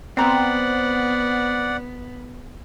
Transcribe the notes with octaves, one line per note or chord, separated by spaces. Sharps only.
B3 C4 D5 E5 F#5 A#5